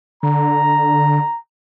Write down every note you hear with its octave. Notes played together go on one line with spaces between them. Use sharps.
D3 A#5